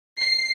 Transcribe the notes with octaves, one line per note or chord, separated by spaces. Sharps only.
C7